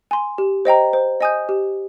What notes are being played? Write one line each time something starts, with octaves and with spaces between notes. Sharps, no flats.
G#5 C6
G4
C5 D#5 G5 A#5
C5
D#5 G#5 D#6 G6
G4